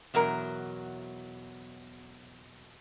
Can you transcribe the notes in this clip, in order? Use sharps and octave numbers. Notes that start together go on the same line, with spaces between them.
E2 B2 F#3 A#4